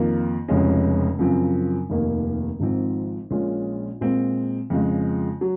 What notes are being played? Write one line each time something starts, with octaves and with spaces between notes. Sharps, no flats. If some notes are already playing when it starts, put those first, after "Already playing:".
Already playing: F2 D#3 A#3 F4
F1 F2 C#3 G#3 C#4
F#2 C#3 F3 C4
F1 D#2 D#3 A#3
G#1 G#2 F3 C4
A#1 A#2 G#3 C#4 F4
A#2 G#3 C4 F4
F2 C#3 F3 G#3
F#3